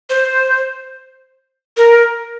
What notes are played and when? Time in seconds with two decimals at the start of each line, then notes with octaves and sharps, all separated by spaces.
0.10 C5
1.77 A#4